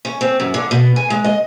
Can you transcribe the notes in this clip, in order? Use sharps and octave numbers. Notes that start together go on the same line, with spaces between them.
C#4
C4
F#2
D3
B2
G#5
G#3
D#5